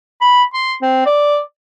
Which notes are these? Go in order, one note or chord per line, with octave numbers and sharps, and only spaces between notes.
B5
C6
C4
D5